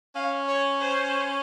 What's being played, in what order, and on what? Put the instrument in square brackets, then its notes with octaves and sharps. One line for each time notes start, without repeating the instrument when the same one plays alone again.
[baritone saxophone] C#4 [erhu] F5
[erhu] C#5
C5